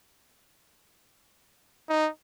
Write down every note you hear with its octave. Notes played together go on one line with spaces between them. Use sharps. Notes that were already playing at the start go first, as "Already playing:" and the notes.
D#4